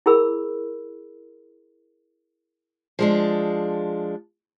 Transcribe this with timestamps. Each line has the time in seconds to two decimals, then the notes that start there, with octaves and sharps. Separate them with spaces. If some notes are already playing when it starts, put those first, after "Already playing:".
0.06 E4 G#4 A#4 B5 E6
2.99 F3 G#3 D4